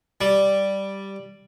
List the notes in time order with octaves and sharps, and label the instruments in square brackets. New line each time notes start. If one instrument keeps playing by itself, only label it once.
[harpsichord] G3